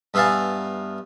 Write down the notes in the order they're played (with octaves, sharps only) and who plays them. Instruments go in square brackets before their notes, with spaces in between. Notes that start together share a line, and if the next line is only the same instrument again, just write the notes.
[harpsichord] G2 B3 E5 F5 G#5 A5